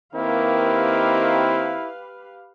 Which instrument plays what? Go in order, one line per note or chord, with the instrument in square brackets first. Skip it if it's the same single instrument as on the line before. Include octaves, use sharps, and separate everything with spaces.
[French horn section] D#3 A#3 C4 [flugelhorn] E4 [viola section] G4 B4 F5